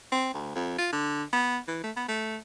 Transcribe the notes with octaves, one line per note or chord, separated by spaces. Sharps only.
C4
D2
F2
F4
D3
B3
E3
A3
B3
A3